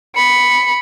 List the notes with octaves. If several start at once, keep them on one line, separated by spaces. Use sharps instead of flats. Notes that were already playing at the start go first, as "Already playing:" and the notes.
B5 C#7